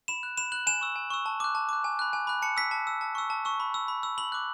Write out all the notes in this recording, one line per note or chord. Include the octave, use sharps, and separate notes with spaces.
B5 E7
F#6
B5 E7
F#6 F#7
G#5 E7
C#6 E6
G#5
C#6 E6
A5
D6 F#6
A5
D6 F#6
G#5
B5 F#6
G#5
B5 F#6
A5 C#7
E6 B6
A5
E6
A5
C#6 E6
A5
C#6 E6
B5
E6
B5
E6
B5 F#7
D6 F#6